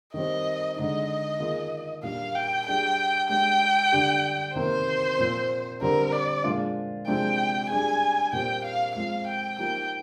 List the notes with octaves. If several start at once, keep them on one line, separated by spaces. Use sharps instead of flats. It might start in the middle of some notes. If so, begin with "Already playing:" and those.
D#3 G3 C4 D#5
D3 G#3 D#4 D#5
D#3 A#3 F4 G#4
A#2 G3 D4 F5
G5
G3 D4 G#4 G5
G#3 D4 G4 G5
D3 G3 D4 G4
C3 D#3 A#3 C5
A#2 F3 C4
D3 G3 C4 A#4
D5
A#2 F3 G#3 D4 F4
C3 F3 G#3 D4 G5
G3 D4 G#4 G#5
A#2 G3 C4 G4 G5
F5
F3 G#3 C4 F4 G#4 F5
G5
F3 A#3 D#4 G4 G5